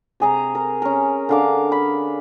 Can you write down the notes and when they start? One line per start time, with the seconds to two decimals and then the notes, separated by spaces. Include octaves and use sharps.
0.20 C3 G#4 A#5
0.55 A#4
0.82 C#4 A#4
1.29 D3 F5 D6
1.72 B5